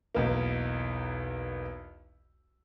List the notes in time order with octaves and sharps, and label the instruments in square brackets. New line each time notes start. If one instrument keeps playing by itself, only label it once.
[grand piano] B1 E2 A#3